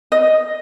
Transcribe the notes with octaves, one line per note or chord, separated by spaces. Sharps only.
D#5